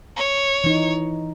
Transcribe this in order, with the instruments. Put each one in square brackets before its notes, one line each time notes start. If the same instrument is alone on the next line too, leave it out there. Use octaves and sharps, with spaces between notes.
[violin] C#5
[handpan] E3 D#4